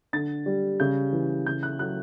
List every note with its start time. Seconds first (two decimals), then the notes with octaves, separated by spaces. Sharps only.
0.13 D3 A6
0.46 G3
0.80 C#3 G6
1.13 E3
1.46 C#3 G6
1.63 F#6
1.79 F#3 F#6